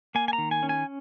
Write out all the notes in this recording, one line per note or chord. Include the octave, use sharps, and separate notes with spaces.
A#3 G#5
G#5
A#5
D#3
G#5
C#4
G#5